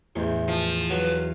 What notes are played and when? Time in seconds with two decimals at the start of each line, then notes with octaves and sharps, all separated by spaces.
0.16 A1 E2
0.48 F3
0.90 F#3 B4